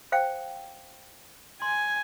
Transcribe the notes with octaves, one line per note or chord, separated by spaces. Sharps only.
C5 F5 G5
G#5 C6